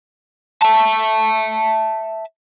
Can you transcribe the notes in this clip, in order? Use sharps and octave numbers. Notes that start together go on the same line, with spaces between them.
E5 A5